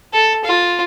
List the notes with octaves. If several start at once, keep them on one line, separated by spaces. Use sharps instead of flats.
A4
F4